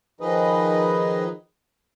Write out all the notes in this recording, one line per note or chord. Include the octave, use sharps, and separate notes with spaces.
D#3 F3 D#4 G#4 B4 D#5